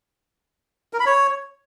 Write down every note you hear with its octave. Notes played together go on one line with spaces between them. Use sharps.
A#4
B5
C#5